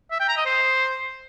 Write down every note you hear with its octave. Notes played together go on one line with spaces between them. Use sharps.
E5
G5
A#5
D#5
C5